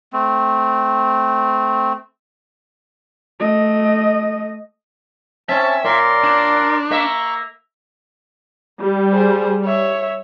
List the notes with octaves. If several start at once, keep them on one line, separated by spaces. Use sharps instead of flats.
A3 C4
A3 D#5
C4 C#4 E5 A5
A#2 A#4 D5 C6
D4
A#3 E5 A#5 C#6
G3
G#4 C5
C#5 E5